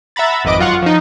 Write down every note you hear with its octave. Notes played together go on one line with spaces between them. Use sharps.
E5 F#5 A#5 B5 A6
G#1 F2 B4 D#5 D6 D7
F#2 F4 F#5 C#6
F3 D#4